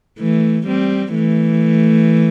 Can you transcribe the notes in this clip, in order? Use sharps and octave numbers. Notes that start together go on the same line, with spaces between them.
E3 A3
G3 C4
E3 A3